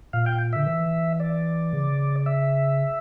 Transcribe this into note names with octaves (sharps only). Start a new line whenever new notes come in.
A#2 F5
G5
D3 E5
E3
D5
C#3
E5